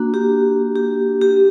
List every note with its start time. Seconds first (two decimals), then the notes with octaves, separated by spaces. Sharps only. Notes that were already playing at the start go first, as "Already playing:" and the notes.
Already playing: A#3 D4 F#4
0.14 G4
0.76 G4
1.21 G4